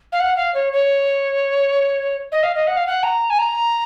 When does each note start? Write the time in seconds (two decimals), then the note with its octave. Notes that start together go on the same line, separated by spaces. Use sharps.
0.12 F5
0.20 F#5
0.37 F5
0.54 C#5
0.73 C#5
2.32 D#5
2.43 F5
2.55 D#5
2.67 F#5
2.77 F5
2.87 F#5
3.03 A#5
3.30 G#5
3.39 A#5